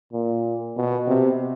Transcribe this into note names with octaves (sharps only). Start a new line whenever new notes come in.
A#2
B2
C3